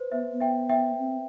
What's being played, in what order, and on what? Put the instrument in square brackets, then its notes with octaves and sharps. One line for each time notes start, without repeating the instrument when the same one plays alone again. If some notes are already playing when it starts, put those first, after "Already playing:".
Already playing: [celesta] B4 C5
[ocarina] B3 [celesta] C5 E5
[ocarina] B3
[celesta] E5 G5
E5 G5
[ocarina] C4